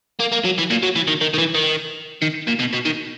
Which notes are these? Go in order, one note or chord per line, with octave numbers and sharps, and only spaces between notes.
A#3
A#3
F#3
E3
A#2
F#3
E3
D#3
D#3
D#3
E3
D#3
D#3
A#2
B2
B2
D#3